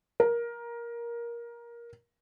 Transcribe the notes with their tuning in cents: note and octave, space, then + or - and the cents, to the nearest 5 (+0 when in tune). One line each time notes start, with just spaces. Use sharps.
A#4 +15